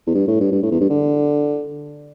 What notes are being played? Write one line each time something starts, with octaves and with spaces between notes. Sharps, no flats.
E2
G2
A2
G2
G2
A2
E2
G2
D3